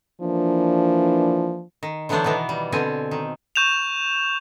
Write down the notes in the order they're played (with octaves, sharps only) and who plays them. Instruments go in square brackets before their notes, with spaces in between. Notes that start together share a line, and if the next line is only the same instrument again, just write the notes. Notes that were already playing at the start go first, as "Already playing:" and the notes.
[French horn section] E3 A#3 D4 [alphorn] F3
[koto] D#3
D3 E3 F#3 B3 D4 C5
B2 D#3 E3 B3
G3
B2 D3 C4 G#5
D#3
[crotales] C#6 G6 E7 F7